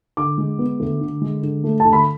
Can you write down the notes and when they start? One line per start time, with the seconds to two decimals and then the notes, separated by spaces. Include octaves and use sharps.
0.17 D3 D6
0.38 G#3
0.59 B3
0.80 D2
1.01 D3
1.22 G#3
1.43 D3
1.64 A3
1.80 A5
1.85 D2
1.93 B5